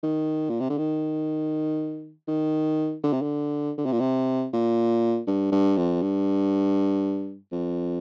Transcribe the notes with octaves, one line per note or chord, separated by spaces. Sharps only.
D#3
A#2
C3
D3
D#3
D#3
D3
C3
D3
D3
C3
A#2
C3
A#2
G2
G2
F2
G2
F2